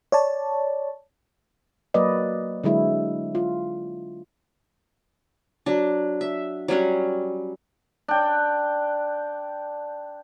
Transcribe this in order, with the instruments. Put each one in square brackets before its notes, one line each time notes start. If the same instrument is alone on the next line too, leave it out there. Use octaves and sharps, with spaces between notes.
[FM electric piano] C#5 D5 A5
[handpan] F#3 A#3 B4 D5 D#5
D3 F#3 G#3 E4
F4
[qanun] F#3 D4
E5
F#3 G3 C#4 F#5
[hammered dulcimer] D4 G5